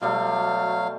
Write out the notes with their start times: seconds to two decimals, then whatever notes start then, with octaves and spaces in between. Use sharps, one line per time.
0.02 B2 F#3 G3 A3 F5